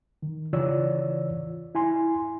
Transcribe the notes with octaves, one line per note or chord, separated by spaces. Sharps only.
D#3
C#3 E3 F4 C#5 D5 E6
E4 G#5 C6